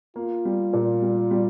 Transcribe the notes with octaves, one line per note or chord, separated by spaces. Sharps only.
A#3 F4
G3
A#2
G3
G3